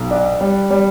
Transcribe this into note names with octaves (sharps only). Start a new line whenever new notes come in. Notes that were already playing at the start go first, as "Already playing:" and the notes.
Already playing: B1
D4
G3
G3